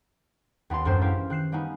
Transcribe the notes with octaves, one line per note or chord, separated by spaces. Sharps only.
D#2 B3 F4 A5 C6
A1 F#2 G#3 D4 C5
E4 G4 A#4 C5 F5
D#3 F#6 C7 E7
G3 A#3 B3 C#4 D#4